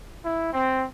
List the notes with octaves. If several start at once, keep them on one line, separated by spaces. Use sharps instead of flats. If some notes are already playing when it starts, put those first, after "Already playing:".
E4
C4